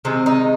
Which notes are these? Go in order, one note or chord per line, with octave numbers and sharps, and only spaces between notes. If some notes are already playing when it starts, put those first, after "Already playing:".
C3 D#3 G#3 C4
D#4